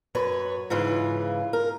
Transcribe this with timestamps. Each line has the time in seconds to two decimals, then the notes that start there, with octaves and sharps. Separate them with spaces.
0.15 F#2 B4 C#5
0.70 G#2 C#3 E3 F4
1.53 A#4